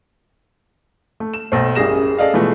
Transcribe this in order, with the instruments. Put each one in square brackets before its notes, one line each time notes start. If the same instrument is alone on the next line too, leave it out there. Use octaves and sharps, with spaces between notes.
[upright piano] A3
E7
B1 A3 C5
A1 F#2 G3 G#4 A#6 E7
G#4 A4 D5 D#5 F5
B2 E3 F3 G#3 A3